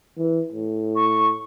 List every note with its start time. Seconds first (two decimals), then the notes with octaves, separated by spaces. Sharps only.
0.17 E3
0.52 A2
0.95 C#6